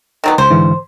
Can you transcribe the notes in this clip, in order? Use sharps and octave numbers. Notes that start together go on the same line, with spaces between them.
D#3 F#3 B3
C#2 C5
G#2 D3 E3